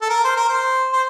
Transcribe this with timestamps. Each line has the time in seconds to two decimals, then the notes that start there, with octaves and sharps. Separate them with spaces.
0.01 A4
0.09 A#4
0.24 C5
0.37 A#4
0.49 C5
0.92 C5